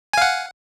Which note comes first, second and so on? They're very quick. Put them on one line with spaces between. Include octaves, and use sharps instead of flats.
G#5 F5 F#5